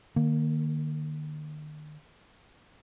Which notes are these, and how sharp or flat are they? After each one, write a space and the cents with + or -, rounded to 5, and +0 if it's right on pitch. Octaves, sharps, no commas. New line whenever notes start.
D#3 -45 A#3 +0